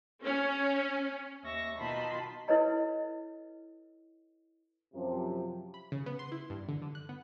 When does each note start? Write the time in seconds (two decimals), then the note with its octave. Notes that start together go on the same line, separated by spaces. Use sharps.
0.24 C#4
1.44 D#2 E5 C#6 A#6
1.79 B2 D#3 F4 A5 B5 C6
2.48 E4 A4 B4 C#5 D#5 A#5
4.95 F#2 C3 F3
5.74 B5
5.92 C#3
6.06 B3
6.19 C6
6.32 E4
6.50 G2
6.68 D3
6.82 D3
6.95 F#6
7.09 B3